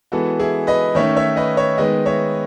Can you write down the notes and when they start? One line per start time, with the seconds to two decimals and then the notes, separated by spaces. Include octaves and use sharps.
0.12 E3 G#3 B3 F#4 A4
0.40 E4 G#4
0.67 B4 D#5
0.95 D#3 A3 C#4 C#5 E5
1.16 C#5 E5
1.36 B4 D#5
1.57 C#5 E5
1.78 D#3 G#3 B3 B4 D#5
2.05 C#5 E5